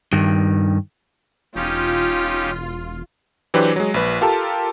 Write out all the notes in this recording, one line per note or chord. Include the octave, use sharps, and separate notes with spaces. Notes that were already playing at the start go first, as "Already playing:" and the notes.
G2 D#3
E1 C#4 D#4 F4 G4
E3 F#3 D4 G4 B4 C5
F#3 G#3
A#1 B4
F4 G4 A4 A#4 A5